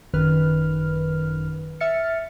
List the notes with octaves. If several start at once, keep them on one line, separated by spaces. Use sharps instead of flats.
G#1 F#2 D#3 B4 F6
E5 F6 A6 C#7